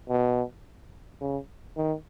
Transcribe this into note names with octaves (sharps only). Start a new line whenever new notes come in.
B2
C#3
D#3